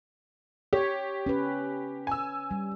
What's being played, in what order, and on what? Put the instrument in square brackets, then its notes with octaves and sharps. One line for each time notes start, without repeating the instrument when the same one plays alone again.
[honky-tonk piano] G4 [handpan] C#5
[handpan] C#4 B4
[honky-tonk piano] G#5 E6
[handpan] G3